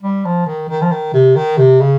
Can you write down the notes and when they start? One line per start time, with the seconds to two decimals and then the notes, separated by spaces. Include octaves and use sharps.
0.02 G3
0.25 F3
0.47 D#3
0.69 D#3
0.82 F3
0.91 D#3
1.14 C3
1.36 D#3
1.58 C3
1.80 C#3